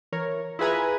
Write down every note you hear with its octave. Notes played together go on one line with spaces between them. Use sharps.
E3 A#4 C#5
E4 F4 G#4 B4 G#5 A#5